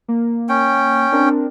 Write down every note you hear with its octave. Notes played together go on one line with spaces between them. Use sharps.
A#3
C#4 G5
C4 D4 A#4